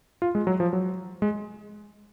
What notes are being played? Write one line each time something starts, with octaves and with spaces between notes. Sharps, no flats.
F4
G#3
F#3
F3
F#3
G#3